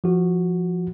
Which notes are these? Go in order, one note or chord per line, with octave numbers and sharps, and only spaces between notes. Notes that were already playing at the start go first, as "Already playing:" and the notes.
F3 F#4